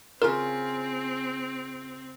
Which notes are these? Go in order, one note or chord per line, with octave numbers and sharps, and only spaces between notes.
C#3 C4 F4 A#4